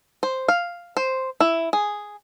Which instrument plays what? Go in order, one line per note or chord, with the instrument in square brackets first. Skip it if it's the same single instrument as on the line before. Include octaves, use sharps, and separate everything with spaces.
[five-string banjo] C5
F5
C5
E4
G#4